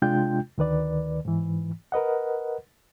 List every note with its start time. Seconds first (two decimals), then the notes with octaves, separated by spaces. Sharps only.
0.02 C3 G#3 D4 F4 G5 G6
0.58 D2 D#3 B4 D5
1.25 G#2 E3
1.92 A#4 B4 D#5 F#5